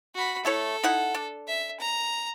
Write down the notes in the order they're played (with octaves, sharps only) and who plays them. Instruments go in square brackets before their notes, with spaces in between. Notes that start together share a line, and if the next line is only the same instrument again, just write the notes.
[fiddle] F#4 B5
[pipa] A3 E4 C#5 [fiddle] A4
[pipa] D#4 E4 F#5
D4
[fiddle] E5
A#5